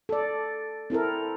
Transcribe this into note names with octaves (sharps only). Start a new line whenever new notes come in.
A4 D5
C4 E4 A4 A#4